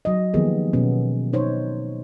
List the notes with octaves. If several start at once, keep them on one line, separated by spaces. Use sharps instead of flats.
F#3 D#5
D#3 F3 A#3 B3 G4 G#4
B2 B3 C#4
D#4 C5 C#5